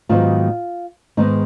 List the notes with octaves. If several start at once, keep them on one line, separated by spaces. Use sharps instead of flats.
G#2 D#3 F#3 B3 F4
G#2 D#3 G#3 B3 D#4